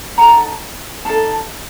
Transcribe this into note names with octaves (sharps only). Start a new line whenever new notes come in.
D#4 A4 F#5 A#5
D#4 A4 F5 A5